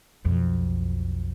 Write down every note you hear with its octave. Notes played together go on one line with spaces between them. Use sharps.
B1 F2